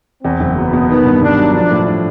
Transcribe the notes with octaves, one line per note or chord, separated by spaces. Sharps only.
E2 C4
F#1
F#3 B3
B2
D#3 B3
G2
G2 D4
F#3
F3 D4
A2
D4